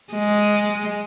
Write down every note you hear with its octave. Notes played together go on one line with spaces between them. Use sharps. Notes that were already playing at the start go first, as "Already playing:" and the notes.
G#3